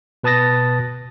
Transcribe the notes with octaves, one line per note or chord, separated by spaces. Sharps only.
B2 B4 A5 D#6 A6 A#6